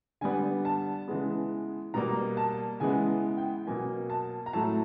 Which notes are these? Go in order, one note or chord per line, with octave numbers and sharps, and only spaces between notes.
D3 G3 B3 G#5
A5
C#3 E3 G#3 B3
B2 G3 A#3 A#5
A5
C#3 E3 G#3 B3 G#5
G5
B2 F#3 A#3 G#5
A5
A#5
A2 F#3 A3 A5